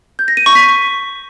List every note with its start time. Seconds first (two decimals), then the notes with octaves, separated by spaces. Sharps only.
0.19 G6
0.28 A#6
0.37 D#7
0.46 C#6
0.55 B6